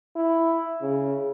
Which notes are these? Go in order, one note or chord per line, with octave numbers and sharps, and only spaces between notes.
E4
C#3